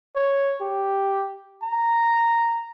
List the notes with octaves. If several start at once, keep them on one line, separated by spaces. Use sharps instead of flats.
C#5
G4
A#5